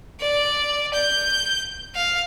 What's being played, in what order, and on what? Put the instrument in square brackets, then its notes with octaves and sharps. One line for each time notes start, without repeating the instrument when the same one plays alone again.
[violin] D5
G6
F5